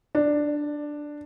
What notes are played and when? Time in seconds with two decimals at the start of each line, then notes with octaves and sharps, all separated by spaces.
0.15 D4